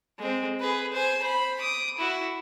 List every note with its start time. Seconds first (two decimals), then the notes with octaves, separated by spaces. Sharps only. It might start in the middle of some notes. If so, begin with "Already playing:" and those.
0.19 G#3 C4
0.60 G#4 B4
0.92 C5 G#5
1.23 C5 B5
1.61 D6 D#6
1.98 E4 F#4